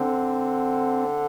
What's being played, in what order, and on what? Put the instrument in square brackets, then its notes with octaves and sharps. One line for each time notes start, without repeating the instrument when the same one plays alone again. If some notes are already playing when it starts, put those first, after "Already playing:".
Already playing: [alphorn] D3 [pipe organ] C4